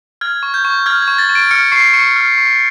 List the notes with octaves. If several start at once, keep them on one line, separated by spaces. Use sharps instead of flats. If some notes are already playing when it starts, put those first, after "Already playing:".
F6 G#6
C#6
G6
C#6
F6 G#6
G#6
C#6
A6
C#6
D7
F6 C#7
C#6 C7
C#6 C#7
F6
C#6